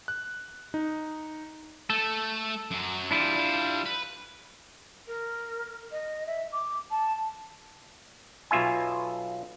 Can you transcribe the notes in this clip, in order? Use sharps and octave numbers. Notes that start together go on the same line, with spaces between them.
F#6
D#4
A3 A4
F#2 F#3
E3 G3 D4 E4 F4
G3 F5
B4
A#4
D#5
E5
D6
A5
B1 B2 F4 E5 G#5